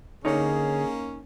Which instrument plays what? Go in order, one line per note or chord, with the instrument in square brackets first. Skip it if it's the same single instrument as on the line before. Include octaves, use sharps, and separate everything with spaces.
[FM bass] D3 [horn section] A#3 C#4 [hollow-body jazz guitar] D#4 C#5 [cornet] G#4